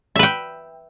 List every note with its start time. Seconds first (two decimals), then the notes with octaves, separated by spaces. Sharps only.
0.16 E5
0.19 B4
0.23 G5